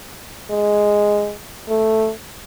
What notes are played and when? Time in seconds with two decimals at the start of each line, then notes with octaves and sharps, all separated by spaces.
0.50 G#3
1.69 A3